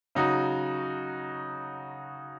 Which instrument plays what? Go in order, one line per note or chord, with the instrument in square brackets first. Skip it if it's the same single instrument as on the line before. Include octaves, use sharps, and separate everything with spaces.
[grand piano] C#3 F#3 D#4 F#4